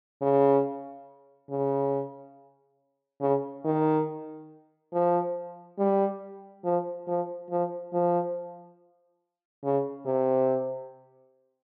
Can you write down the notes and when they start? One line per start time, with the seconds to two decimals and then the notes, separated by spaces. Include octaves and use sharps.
0.22 C#3
1.50 C#3
3.21 C#3
3.65 D#3
4.93 F3
5.79 G3
6.64 F3
7.07 F3
7.50 F3
7.93 F3
9.64 C#3
10.06 C3